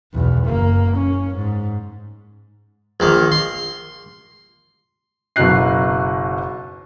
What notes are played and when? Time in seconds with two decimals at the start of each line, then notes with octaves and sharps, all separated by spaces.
0.13 B1 E2
0.45 F#1 A#3
0.97 C#4
1.35 G#2
3.00 A#1 D#3 A#3
3.32 C6
5.36 F#1 B2 F#3 D#4 F#6 C7